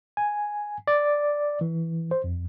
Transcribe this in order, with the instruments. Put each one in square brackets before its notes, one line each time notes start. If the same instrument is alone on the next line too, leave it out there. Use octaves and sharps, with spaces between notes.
[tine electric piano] G#5
D5
E3
C5
F2